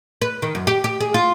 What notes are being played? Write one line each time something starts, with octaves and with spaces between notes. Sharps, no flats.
B4
D#3
F#2
G4
G4
G#4
F4